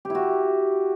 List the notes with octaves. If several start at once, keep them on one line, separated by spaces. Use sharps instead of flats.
E4 F#4 G4